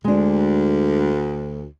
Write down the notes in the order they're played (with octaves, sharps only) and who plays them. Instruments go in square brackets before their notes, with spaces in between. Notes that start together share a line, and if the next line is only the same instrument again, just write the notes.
[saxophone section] D2 [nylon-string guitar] G#3 D4